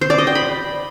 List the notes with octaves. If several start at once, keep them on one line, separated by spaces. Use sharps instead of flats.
C5
D5
D#5
G5
B5